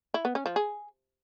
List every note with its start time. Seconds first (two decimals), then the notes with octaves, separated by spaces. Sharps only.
0.14 E4
0.25 B3
0.35 C#4
0.46 F3
0.56 G#4